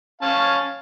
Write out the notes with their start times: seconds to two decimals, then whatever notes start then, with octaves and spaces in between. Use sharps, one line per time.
0.22 C#4 F5 A5